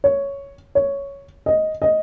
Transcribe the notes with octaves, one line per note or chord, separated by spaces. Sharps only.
C#5
C#5
D#5
D#5